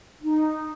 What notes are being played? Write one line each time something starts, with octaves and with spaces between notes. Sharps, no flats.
D#4